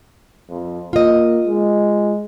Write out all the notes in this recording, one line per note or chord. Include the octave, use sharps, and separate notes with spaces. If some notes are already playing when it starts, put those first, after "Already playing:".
F2
A#3 F4 D#5
G#3